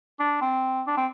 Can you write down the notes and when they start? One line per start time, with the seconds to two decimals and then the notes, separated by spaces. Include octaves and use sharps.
0.20 D4
0.41 C4
0.87 D4
0.97 C4